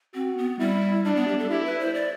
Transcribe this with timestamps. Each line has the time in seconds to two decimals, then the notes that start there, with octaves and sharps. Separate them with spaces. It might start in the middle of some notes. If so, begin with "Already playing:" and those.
0.15 C4 F#4
0.38 B3
0.59 G3 E4
1.05 G3 D4
1.16 B3
1.28 G4
1.38 A4
1.50 E4 G4
1.65 B4
1.80 C5
1.94 D5